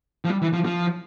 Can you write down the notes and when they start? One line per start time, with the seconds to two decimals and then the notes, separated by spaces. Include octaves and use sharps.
0.24 F3
0.29 G3
0.42 E3
0.53 F3
0.65 F3